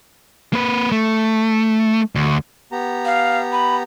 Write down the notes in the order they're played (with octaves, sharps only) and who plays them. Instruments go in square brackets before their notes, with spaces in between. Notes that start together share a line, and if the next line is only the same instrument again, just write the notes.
[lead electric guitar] A#3 B4
A3
D2
[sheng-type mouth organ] B3 G4 A#5
[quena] F5
B5